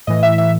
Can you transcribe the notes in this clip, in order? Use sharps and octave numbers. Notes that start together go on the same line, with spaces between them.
A2 E3 D#5
E5
E5